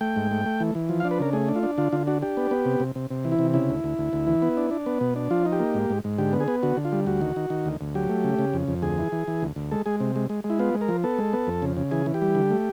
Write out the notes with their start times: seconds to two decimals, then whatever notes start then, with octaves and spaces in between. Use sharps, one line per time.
0.01 A3 G5
0.16 G#2
0.31 A3
0.46 A3
0.60 E3
0.75 E3
0.89 F3
1.00 F5
1.04 D4
1.11 B4
1.19 C#3 A#4
1.33 A3 G#4
1.48 D4
1.56 F4
1.63 D4
1.78 D3 F4
1.92 D3 F4
2.07 D4 F#4
2.22 D4 G4
2.37 B3
2.51 B3
2.65 C3
2.80 C3
2.95 C3
3.10 C3
3.25 E3
3.32 E4
3.39 C3
3.54 C#3 E4
3.69 D2
3.84 D2
3.98 D2
4.13 D2
4.27 E3
4.42 B3
4.57 D4
4.71 D4
4.86 B3
5.01 B2
5.16 D4
5.31 F3 F4
5.45 D#4
5.52 G4
5.60 A#3
5.74 G#2
5.90 G#2
6.04 G#2
6.18 D3 G4
6.33 B3
6.40 G#4
6.48 B3
6.63 D3 F#4
6.77 D3
6.85 F4
6.92 G3
7.06 D2 F#4
7.21 D#3
7.36 D#3
7.50 D#3
7.66 D2
7.81 D2
7.95 F#3 G4
8.09 A3
8.24 C#3
8.39 C#3
8.54 F2
8.68 F2
8.82 D2 G#4
8.98 E3
9.12 E3
9.28 E3
9.42 D2
9.56 D2
9.71 G#3 A4
9.86 G#3 G#4
10.00 C3
10.16 G#3
10.30 G#3
10.44 G#3
10.50 E4
10.59 B3 F4
10.74 G#3
10.81 A#4
10.88 F3
11.03 B3 A4
11.18 G#3
11.33 B3
11.47 F2
11.62 C#3
11.77 C#3
11.91 E3 G#4
12.06 E3
12.14 G4
12.22 G3
12.35 D3
12.51 A3